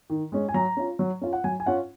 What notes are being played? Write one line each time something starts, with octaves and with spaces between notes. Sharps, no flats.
D#3
G#3 C#4
G#5
F#3 A#5
C#4 F4
F#3
C#4 F4
F#5
F#3 G#5
G#5
C#4 F4 F#5